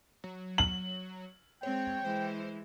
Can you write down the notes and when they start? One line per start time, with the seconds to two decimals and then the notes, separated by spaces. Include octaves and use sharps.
0.24 F#3
0.58 F#7
1.63 G#3 C4 C#5 G5
2.05 E3 G#3 C5